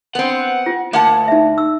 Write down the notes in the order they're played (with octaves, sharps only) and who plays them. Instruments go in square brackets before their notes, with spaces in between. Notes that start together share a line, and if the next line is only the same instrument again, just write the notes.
[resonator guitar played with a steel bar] B3 C4 [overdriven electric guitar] F#5
[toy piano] F4
[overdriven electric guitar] D2 [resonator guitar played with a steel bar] A#3 F#5 A5
[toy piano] D#4 E5
E6